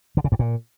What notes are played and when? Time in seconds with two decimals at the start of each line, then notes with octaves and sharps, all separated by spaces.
0.17 D3
0.24 C#3
0.32 G2
0.39 A#2